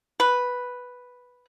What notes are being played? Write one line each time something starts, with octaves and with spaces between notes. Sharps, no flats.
B4